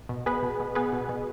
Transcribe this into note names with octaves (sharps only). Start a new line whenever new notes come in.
B2
B3 G#4 B4
B2
B2
B3 G#4 B4
B2
B2